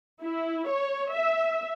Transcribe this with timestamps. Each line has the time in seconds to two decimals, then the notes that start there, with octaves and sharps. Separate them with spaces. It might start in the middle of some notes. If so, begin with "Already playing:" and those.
0.22 E4
0.68 C#5
1.14 E5